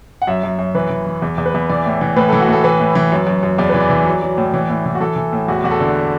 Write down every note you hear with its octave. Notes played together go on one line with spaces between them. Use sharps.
F#5
F#2 E5
F#2
F#2
E3 B4
E3
E3
E2
E2
B4
E2
E3 D5
A2
E3
A2 B4
E3 A4
F#4
A2 A4
E3 B4
A2
E3
F#2
F#2
F#2
E2 D5
E3 B4
D5
E3
F#3
F#3
A2
E3
A2
E3
F#4
E3 A4
E3
A2
E2 F#4
E2 F#4
A4
D3